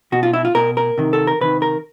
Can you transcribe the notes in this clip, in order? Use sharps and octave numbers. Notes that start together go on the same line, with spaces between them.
B2 F#4
F4
E4
F4
B2 A#4
A#4
C3 D#3
A4
A#4
C3 D#3 B4
A#4